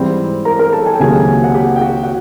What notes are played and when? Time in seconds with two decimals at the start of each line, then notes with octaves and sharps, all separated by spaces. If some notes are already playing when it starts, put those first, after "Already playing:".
Already playing: G#2 E3 G3 C4 E4
0.45 A#4 A#5
0.59 A#4 A#5
0.73 A4 A5
0.86 G#5
0.94 G5
1.00 C#2 C3 D#3 F#3 A#3 G#4 G#5
1.44 F#5
1.54 G4 G5
1.76 G5
1.81 F#4 F#5
2.04 F#5